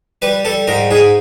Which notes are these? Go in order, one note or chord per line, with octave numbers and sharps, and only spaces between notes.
G3 B4
G3 A4
G#2 A#4
G#2 G#4